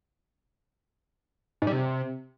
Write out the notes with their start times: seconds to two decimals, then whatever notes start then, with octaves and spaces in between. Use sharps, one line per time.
1.62 G#2
1.67 G3
1.72 C3